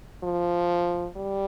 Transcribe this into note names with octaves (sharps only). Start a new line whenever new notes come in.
F3
G3